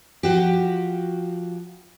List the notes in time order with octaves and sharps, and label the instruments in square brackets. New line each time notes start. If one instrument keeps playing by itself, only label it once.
[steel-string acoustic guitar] F3 F#4 G4